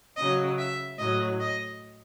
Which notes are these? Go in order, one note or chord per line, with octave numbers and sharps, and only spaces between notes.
C#3 F#3 D#5
E5
A2 F#3 D#5
D#5